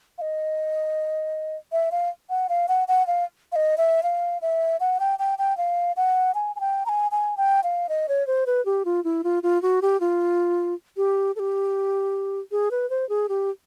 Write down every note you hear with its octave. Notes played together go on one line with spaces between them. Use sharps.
F5
D#5
E5
F5
F#5
F5
F#5
F#5
F5
F5
D#5
E5
F5
E5
F#5
G5
G5
G5
F5
F#5
G#5
G#5
G5
A#5
G#5
G#5
G5
F5
D#5
C#5
C5
B4
G4
F4
E4
F4
F4
F#4
G4
F4
G4
A4
G4
G#4
B4
C5
G#4
G4